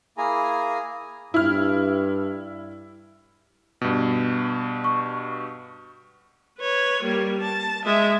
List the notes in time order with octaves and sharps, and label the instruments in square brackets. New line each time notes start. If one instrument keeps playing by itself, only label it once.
[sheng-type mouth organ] A#3 E4 G#4 G#5 A#5
[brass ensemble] G2 [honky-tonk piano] E4 F6
[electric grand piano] G2 B2
[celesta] C#6
[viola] B4 C#5
G3 A#3
A5
G#3 E5